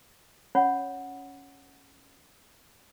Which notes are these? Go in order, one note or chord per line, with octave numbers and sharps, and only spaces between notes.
C#4 C#5 F#5 B5